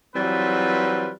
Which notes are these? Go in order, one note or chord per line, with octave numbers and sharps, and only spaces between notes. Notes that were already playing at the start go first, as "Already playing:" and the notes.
E3 F#3 G3 C4 F4 B4